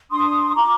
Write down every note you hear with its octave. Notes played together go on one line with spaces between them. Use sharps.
D4 C6 D#6
F4 A#5 D6